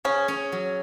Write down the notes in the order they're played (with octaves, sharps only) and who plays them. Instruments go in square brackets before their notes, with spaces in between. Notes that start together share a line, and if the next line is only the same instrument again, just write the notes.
[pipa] C#4 [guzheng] G#4
[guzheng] C#4
F#3